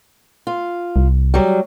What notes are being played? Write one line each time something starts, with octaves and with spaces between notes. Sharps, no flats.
F4
C2
F#3 G3